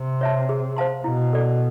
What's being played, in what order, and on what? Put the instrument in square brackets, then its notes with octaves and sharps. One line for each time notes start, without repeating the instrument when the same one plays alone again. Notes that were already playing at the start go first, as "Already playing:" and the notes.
Already playing: [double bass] C3
[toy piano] C#5 E5 A5
G#4
C5 F5 A5 C6
[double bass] B2 [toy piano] E4
[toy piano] A4 D5